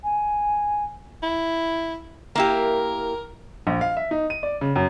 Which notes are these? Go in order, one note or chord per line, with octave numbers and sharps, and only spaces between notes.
G#5
E4
A#3 E4 G4 A#4
A#1
F5
E5
D#4
D#7
D5
C#3
F#2